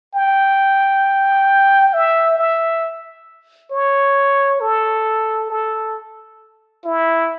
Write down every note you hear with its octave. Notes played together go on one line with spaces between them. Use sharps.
G5
E5
E5
C#5
A4
A4
E4